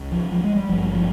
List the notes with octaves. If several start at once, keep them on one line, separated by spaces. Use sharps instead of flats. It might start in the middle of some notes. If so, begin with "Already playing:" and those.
Already playing: C#2 C#3
F3
F3
G#3
G3
G#1 G2 F3
F3